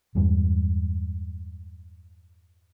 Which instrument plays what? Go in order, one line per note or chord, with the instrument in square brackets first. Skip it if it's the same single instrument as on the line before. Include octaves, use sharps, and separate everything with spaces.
[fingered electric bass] E2 G2 G#3